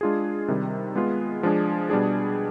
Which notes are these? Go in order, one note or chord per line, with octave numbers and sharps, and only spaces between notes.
G#3 D4 F4 G#4
C3 D#3 G3
G#3 B3 F4 G#4
F3 G#3 D4 G#4
B2 G3 D4 G#4